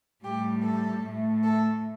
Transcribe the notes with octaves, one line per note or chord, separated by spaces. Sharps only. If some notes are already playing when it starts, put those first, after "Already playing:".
A2 G3 G4
A4
A2 A3
A4